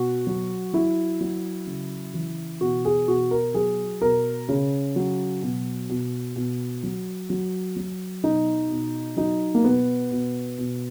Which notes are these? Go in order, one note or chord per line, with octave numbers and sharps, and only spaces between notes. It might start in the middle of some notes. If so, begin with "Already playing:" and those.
Already playing: B2 F#4
F#3
F#3 E4
F#3
C#3
E3
B2 F#4
G#4
B2 F#4
A#4
F#3 G#4
B2 A#4
C#3
F#3
B2
B2
B2
F#3
F#3
F#3
B2 D#4
B2
F#3 D#4
A#3
B2 B3
B2
B2